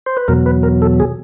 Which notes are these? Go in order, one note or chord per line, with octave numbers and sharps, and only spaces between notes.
C5
B4
E2 B2 F#3 A#4
B4
A#4
A4
G#4